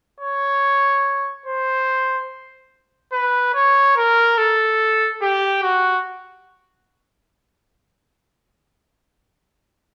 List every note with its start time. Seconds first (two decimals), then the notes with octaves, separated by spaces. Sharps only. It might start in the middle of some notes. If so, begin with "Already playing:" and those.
0.21 C#5
1.46 C5
3.12 B4
3.54 C#5
3.97 A#4
4.38 A4
5.21 G4
5.63 F#4